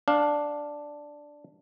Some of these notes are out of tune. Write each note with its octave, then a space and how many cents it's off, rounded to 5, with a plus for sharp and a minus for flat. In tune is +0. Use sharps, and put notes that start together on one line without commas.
D4 +0 F5 +15